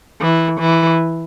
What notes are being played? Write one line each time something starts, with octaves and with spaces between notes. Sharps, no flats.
E3
E3